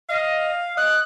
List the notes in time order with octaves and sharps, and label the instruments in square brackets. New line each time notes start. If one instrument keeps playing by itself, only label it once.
[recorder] D#5 [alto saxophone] F5
[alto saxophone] D#5 [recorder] F#6